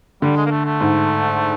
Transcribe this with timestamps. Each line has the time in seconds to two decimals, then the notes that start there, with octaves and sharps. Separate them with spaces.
0.22 D3 G3
0.37 G#3
0.46 A#3
0.51 A3
0.65 A3
0.81 G#2